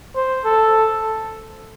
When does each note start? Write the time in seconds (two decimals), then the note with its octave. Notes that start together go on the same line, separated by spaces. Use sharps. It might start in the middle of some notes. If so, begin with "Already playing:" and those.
0.16 C5
0.45 A4